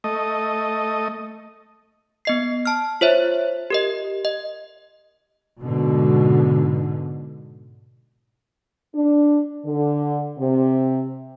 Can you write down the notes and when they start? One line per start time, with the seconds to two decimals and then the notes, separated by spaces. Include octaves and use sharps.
0.04 A3 D#5
2.25 B3 D#5 C7
2.65 A5 F6
3.01 F4 C5 C#5 E5
3.70 G4 A#4 D#5
4.25 D#5
5.61 G#2 B2 D3
8.94 D4
9.65 D3
10.39 C3